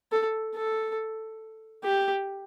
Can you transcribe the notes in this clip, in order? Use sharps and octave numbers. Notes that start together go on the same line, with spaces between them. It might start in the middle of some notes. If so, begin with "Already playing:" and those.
A4
A4
G4